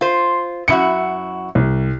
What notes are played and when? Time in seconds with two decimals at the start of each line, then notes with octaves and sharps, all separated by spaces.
0.01 F4 C5
0.68 F#2 E4 F#4 C#7
1.55 C2